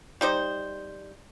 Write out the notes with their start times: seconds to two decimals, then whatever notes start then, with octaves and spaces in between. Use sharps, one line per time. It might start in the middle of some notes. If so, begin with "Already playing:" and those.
0.21 G3 D#4 C5